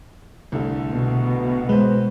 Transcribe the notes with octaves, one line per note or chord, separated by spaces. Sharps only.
C2 D3 A3
B2
G#3 B4 C5